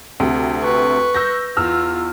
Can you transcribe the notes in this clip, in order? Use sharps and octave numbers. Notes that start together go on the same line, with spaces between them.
D2 C3
B4 C#6
E6 G6 A#6
E2 F4 E6 F6